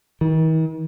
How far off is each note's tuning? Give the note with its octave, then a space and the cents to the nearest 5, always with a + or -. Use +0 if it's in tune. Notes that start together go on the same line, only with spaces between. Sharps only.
D#3 +45